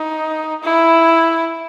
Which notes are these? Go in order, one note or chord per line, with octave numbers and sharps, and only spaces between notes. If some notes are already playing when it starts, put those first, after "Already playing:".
Already playing: D#4
E4